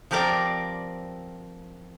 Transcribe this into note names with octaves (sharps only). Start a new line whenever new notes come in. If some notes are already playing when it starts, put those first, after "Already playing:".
F3 C4 G4 A#4 D5